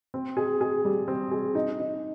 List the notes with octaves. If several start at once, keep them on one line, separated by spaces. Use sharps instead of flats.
C4
G#4
G#4
G3
C4
G#4
D#4
D#4